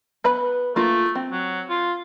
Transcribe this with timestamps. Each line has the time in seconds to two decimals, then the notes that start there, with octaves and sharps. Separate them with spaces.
0.24 B3 B4 B5
0.76 A3 A#3 F4
1.15 C4
1.32 F#3
1.70 F4